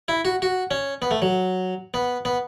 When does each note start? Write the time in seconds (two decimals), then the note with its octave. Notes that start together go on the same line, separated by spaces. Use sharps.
0.08 E4
0.25 F#4
0.42 F#4
0.71 C#4
1.02 B3
1.11 A3
1.22 F#3
1.94 B3
2.25 B3